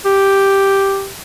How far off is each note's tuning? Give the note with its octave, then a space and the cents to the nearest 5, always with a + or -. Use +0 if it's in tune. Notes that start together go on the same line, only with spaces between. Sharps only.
G4 +0